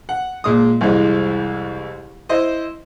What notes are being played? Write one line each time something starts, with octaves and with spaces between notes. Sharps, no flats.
F#5
A#2 G#3 D#6
C2 F2 E3 G#3
E4 C5 D#5